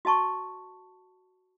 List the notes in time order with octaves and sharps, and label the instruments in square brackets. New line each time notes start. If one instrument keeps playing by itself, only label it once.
[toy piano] F#4 D#5 A5 C#6